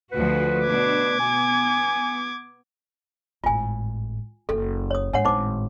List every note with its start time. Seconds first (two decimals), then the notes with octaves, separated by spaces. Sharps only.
0.12 D2 F3 F#4 B4
0.66 B2 D4 D6 G#6
1.20 B3 G#5
3.44 G#1 A2 F4 G#5
4.49 F#1 F#2 A4
4.91 C#5 D#6
5.13 G#2 D4 C#5 F#5
5.25 G#1 A2 D#4 C5 D6